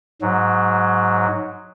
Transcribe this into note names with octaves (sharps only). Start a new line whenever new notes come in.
G#2 F#3